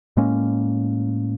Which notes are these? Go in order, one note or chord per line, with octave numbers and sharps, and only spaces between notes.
A2 G#3 A#3 C#4